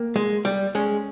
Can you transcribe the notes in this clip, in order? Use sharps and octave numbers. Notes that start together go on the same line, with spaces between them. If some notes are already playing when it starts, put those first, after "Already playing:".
Already playing: A#3
G#3
G3
G#3 C#4